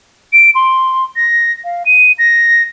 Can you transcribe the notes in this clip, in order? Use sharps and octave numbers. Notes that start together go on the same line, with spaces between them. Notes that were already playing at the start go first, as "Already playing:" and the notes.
D7
C6
A#6
F5
D#7
A#6